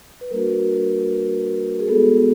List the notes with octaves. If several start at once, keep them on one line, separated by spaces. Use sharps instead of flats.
B4
G3 A#3 D4 F#4 A#4
G#4
G#3 B3 D#4 F#4 A4